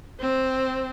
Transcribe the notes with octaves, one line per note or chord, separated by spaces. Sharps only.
C4